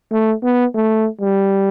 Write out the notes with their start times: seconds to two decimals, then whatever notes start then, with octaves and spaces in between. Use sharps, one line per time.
0.12 A3
0.43 B3
0.75 A3
1.21 G3